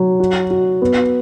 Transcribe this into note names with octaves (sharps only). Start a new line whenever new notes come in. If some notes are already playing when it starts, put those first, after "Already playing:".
Already playing: F#3
F#4
F#4
B3